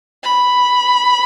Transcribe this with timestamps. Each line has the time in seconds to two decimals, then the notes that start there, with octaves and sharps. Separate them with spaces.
0.24 B5